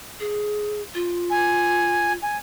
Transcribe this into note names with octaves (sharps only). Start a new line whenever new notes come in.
G#4
F4
G#5
G#5